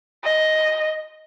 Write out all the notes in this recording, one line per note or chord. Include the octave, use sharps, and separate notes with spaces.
D#5